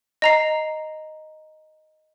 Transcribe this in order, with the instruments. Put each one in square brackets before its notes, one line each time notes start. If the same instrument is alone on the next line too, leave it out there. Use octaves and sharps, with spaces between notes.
[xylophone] D#5 A#5 C7